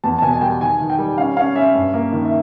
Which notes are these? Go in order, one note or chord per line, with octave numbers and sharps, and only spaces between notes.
E2 A5
A5
B2 G#5
G#5
G3 G5
D#3 G#5
D#3
G5
G3
C#4 F5
C#4 F5
C#4 E5
G2
A#3
D#3
E5